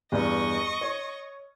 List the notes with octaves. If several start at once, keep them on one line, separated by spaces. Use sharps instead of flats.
E2 G2 D#5 C#6
C#5